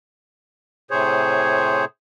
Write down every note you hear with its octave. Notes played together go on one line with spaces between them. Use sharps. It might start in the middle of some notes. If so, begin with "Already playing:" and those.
A2 C3 G#4 C5 C#5